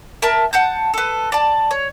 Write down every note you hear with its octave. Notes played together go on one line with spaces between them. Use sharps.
A#4 E5 A5
F#5 A5 G6
A4 B4
D5 A5
C#5